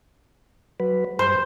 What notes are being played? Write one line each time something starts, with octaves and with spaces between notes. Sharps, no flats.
F#3 B4
G2 C5